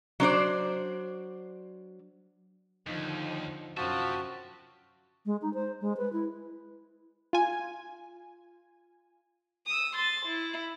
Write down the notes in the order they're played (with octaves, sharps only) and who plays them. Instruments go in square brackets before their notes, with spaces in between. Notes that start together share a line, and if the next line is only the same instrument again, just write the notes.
[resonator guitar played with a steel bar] F#3 D4 C5 D5
[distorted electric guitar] D#2 [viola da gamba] D3 F3 D#4
[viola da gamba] F#2 [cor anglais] F3 [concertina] F#4 A5 [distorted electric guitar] G4 E5
[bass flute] G#3
D#4
C5
G#3
B4
E4
[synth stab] F4 G#5
[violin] D#6 E6
C6 A6
E4